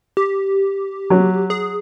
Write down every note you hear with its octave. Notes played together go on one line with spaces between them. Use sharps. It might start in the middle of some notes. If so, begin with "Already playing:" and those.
G4
F#3
G#4